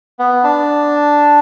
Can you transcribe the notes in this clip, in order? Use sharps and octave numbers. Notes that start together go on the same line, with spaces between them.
B3
D4